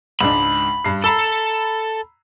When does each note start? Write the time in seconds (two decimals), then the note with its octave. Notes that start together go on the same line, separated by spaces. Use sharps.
0.21 C#2 G#2 D4 B5
0.85 G2 C7
1.04 A4 A#5 B5 E6